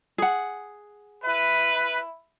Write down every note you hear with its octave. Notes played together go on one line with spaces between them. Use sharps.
G#4 F#5
E4 B4